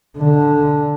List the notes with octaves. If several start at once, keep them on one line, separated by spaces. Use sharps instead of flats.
D3